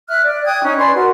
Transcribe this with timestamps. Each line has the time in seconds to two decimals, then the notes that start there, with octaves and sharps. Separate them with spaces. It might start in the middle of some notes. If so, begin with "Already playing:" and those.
0.09 E5 F6 F#6
0.23 D5
0.45 G5 D#6 F#6 G#6
0.63 C#4 D#4
0.78 B4 D5 G#5 C6
0.95 F#4 A#4